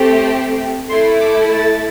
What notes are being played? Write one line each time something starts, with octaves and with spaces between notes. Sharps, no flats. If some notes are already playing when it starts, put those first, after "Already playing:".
Already playing: A3 C4 G4
A3 E4 A4 C6
D6
A6